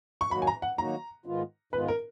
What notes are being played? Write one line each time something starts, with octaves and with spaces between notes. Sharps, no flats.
C#6
D#3 F#3 A#3 D#4 F#4 B5
G#5
A#5
F#5
D#3 F#3 A#3 D#4 F#4 A#5
G#2 D#3 G#3 B3 F4
G#2 D#3 G#3 B3 F4 B4
A#4